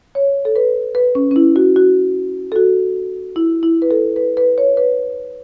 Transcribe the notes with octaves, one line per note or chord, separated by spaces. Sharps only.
C#5
A4
B4
B4
C#4
C#4
E4
F#4
F#4
A4
F#4
E4
E4
B4
A4
B4
B4
C#5
B4